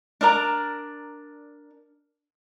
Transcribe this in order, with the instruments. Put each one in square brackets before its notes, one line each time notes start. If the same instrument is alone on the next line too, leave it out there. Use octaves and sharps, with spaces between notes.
[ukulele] D4 A#4 D5 A#5